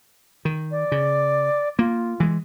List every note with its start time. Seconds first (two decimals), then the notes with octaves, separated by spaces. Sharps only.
0.45 D#3
0.71 D5
0.92 C#3
1.79 A#3 F4
2.20 E3 G#3